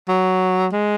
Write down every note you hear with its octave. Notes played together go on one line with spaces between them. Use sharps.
F#3
G#3